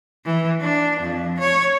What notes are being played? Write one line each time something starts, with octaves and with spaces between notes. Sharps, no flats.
E3
D4
F2
C#5